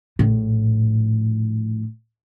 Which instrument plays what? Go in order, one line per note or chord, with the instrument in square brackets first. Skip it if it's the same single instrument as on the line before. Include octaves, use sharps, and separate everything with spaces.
[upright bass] A#1 A2